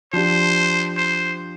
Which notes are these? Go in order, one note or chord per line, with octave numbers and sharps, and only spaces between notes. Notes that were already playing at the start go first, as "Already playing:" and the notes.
F3 D4 G4 C5
C5